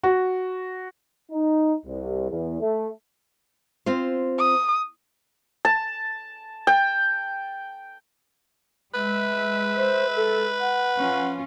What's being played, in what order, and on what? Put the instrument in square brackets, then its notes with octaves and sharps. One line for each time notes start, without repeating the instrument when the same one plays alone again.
[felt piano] F#4
[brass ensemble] D#4
C2
E2
A3
[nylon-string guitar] C4 F4 C5
[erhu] D#6
[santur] A5
G5
[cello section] G#3 E5 [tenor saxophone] B4
[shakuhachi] C5
A4
F#5
[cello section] F3 C#4 F4